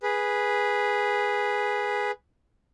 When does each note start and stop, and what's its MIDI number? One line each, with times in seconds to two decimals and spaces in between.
0.03 2.11 68
0.03 2.11 71